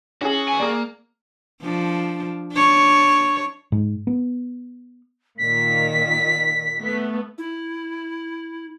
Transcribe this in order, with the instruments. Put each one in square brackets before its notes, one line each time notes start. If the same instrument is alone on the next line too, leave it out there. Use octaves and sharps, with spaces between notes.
[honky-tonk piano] C#4 E4 G#4 [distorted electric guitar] F#4
[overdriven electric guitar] B3 G#5
[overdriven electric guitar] A#3 [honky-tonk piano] G#4 D5
[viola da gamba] F3 D4
D4 C#5
[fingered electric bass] G#2
B3
[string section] A#2 D#3 [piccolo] B6
[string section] A3 B3
[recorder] E4